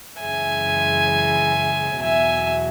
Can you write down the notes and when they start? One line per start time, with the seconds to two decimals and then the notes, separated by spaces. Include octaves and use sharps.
0.20 F#2 C#3 E3 G#3 E5 G#5
2.01 E2 B2 F#3 E5 G#5